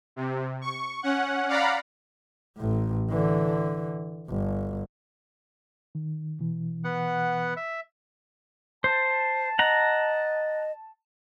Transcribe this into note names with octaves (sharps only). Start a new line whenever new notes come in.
C3
C#6
C#4 F#5
D5 F5 F#5 A#5 B5
A1 A2
D3 E3
G1
D#3
B2 E3
B3 F#5
E5
C5 A5
D#5 F#5 A#5